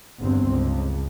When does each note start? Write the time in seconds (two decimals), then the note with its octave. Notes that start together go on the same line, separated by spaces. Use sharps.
0.20 G1 E2 C4
0.50 C#2